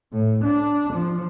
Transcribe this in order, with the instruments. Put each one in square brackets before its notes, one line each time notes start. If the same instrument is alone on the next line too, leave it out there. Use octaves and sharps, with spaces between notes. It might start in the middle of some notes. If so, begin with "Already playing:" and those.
[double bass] A2
D4
F3